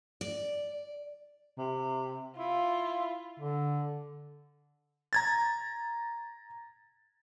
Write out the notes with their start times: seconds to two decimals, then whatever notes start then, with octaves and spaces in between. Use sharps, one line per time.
0.21 D5
1.58 C3
2.38 E4 F4
3.40 D3
5.13 A#5 G#6 A6